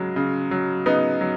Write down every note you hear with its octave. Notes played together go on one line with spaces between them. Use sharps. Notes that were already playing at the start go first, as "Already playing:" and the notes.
Already playing: C#3 F#3 G#3
C#3
F#3
C#3 B3 D#4
F#3